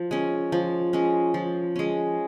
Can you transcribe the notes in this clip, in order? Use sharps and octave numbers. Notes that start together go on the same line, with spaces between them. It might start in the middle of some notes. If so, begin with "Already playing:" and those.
Already playing: F3
G#3 C#4
F3
G#3 C#4
F3
G#3 C#4